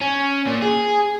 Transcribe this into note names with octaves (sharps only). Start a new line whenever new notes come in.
C#4
A#2
G#4